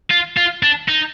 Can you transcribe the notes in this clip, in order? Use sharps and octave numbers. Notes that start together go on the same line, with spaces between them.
F4
F4
D4
D#4